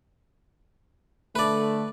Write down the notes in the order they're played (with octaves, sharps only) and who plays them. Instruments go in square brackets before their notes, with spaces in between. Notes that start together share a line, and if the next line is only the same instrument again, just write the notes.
[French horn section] D3 A3 [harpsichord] B4 D5